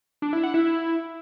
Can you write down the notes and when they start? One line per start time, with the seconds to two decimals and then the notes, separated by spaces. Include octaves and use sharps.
0.22 D4
0.33 E4
0.43 F#5
0.54 E4